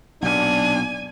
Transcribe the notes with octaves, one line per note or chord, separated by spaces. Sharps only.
B1 A#2 D4 G#5